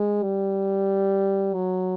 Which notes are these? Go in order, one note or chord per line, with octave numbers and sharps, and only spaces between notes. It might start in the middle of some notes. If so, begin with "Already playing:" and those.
Already playing: G#3
G3
F#3